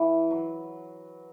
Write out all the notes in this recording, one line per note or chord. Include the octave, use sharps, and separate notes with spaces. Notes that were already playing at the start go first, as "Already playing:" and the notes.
Already playing: E3
F#3